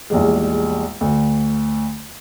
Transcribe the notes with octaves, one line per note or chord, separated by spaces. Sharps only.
A#1 E2 G3 G#3
D2